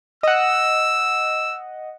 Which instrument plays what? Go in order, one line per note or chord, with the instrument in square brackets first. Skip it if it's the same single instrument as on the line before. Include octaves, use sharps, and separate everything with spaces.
[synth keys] D#5 F#5 [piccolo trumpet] E6